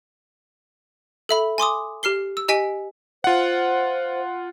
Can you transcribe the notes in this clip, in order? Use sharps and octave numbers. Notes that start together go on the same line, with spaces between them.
A4 E5 B5
G#5 C6 D6 D#6
G4 F6 C7 G7
E6
G4 D#5 G#5 B6 D7
F4 C5 F#5